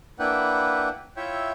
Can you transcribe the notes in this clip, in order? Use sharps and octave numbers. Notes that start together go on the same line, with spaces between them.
A#3 D4 E4 B4 F#5 G5
E4 F4 C#5 E5 G5